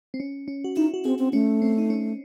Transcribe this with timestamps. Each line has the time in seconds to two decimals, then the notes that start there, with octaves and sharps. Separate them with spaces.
0.14 C4
0.20 C#4
0.48 C#4
0.64 F#4
0.76 D#4 E4
0.94 F#4
1.05 C4 G#4
1.19 C4
1.33 A3 C#4
1.62 C4
1.78 D#4
1.90 C#4